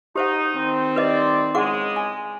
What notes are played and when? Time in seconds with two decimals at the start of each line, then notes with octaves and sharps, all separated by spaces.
0.16 D#4 G4 C5 F#5
0.54 D#3 C4
0.96 G3 B4 D5 D#5
1.55 C#3 G#3 G#4 F#5 D6
1.96 G#5